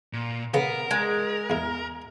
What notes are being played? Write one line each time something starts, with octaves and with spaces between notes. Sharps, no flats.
A#2
C#3 B3 A#4
G#3
E2 E4